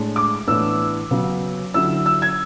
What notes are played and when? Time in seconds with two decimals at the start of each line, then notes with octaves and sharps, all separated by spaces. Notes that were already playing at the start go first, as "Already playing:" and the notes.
Already playing: A2 G#3 D4
0.16 D6
0.47 A2 E3 B3 D4 E6
1.11 C#3 F#3 B3
1.74 D3 F#3 C#4 E4 E6
2.06 E6
2.22 G#6